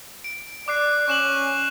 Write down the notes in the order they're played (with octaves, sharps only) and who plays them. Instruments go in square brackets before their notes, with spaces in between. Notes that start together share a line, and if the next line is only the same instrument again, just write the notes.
[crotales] D7
[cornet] D5 [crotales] D6 F#6 C7
[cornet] C#4 [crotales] C#6 E7 F#7